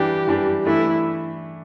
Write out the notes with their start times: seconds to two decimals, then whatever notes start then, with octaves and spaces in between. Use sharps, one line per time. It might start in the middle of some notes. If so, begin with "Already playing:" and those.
Already playing: E3 G3 D4 G4
0.28 E3 G3 D4
0.66 E3 A3 D4 E4